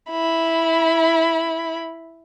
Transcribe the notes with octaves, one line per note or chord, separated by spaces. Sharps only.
E4 B5